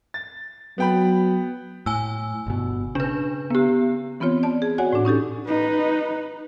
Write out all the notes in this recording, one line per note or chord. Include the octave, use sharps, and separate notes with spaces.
A6
F#3 B3 G5 B5
A2 G#5 E6
G1 B2
C#3 D4 B4
B3 G4
E3 B3 C4 F4 C#5
D5 A5
G#4
F#4 C#5 D5 F#5 G#5
A2 D4
C#4 D#4 G4 A4
D#4 B4